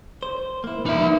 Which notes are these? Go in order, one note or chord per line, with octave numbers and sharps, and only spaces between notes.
C5
A#3 E4
F3 A#3 D#4 B4 E5